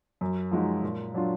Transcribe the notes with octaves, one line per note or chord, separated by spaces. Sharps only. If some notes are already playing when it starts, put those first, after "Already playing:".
F#2
F3 G#3 D#4 F#4
A#2
F#3 D4 F4